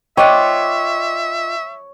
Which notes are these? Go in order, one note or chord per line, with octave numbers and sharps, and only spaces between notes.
D#4 F4 C#5 D5 E5 G5 D6 F#6